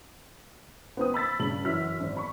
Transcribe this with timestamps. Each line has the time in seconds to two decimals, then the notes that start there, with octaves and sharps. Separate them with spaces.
0.97 B3 C4 D#6
1.14 B5 E6 A6 B6
1.39 G2 C#3 F#7
1.65 F#2 E3 F#4 E6 F6 B6
2.00 G#1
2.17 B5 C#6